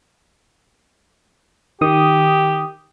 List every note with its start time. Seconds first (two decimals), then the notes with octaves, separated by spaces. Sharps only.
1.81 D#3 G4 D#6